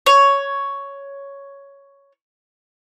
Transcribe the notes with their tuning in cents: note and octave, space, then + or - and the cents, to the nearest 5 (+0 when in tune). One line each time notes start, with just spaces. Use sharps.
C#5 +5